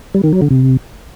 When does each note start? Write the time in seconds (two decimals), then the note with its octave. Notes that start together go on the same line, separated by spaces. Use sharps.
0.14 G3
0.23 D#3
0.32 F#3
0.42 D3
0.51 C3